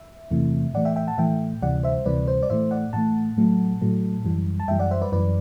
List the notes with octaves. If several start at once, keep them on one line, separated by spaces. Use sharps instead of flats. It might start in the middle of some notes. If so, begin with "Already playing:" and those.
Already playing: E5
E2 C3 E3 A3
A2 E3 A3 D5 F#5
E5 G5
E5 G5
F#5 A5
A2 E3 A3 E5 G5
D2 C3 E3 G3 D5 F#5
C5 E5
D2 C3 E3 G3 B4 D5
C5
D5
A2 E3 A3 C5 E5
D5 F#5
A2 E3 A3 F#5 A5
A2 F#3 A3
A2 F#3 A3
F#2 E3 G3
A5
F#2 E3 G3 E5 G5
D5 F#5
C5 E5
B4 D5
F#2 E3 G3 B4 D5